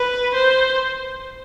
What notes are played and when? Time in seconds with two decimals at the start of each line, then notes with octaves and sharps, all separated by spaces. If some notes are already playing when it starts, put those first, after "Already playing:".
Already playing: B4
0.34 C5